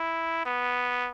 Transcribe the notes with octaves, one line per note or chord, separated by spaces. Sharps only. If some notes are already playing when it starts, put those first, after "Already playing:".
Already playing: E4
B3